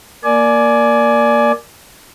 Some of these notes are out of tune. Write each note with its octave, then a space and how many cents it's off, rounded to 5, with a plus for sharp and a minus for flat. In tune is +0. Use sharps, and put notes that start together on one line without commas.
A#3 +0 D5 +0 G#5 +25